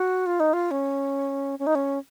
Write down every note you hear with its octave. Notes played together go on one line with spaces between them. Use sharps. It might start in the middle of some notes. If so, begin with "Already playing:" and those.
Already playing: F#4
F4
D#4
F4
C#4
C#4
D#4
C#4